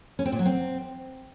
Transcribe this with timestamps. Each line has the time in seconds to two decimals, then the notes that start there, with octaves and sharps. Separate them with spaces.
0.19 C#4
0.25 C4
0.32 A#2
0.39 F#3
0.46 C4